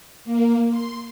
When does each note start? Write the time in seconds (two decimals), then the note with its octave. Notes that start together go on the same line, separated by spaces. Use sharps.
0.25 A#3
0.71 C6